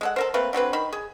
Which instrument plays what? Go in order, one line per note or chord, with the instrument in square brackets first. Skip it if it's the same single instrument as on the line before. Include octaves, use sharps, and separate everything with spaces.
[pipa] G#3 A4 F#5
A4 A#4 C5
A3 A#3 C4 B4
D3 F#3 C4 B4
D#3 B5
G#4